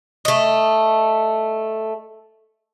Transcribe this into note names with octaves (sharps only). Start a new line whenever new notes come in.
A3 D#5